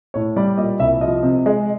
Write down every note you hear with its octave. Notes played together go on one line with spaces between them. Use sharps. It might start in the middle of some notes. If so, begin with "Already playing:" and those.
A2 C#5
G3 D5
A#2 D#5
C2 E5
F3 D#5
C3
G#3